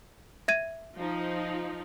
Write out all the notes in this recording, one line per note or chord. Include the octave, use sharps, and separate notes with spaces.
E5 G#6 D#7
F3 D#4